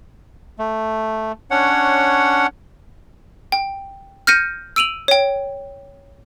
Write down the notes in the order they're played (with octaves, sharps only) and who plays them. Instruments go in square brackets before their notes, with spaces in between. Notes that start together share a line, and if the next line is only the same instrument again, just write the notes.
[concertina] A3
C#4 D4 C#5 F#5
[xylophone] G5
F6 G6 A#6 C#7 D#7
E6 D7 D#7 F7 F#7
C#5 G5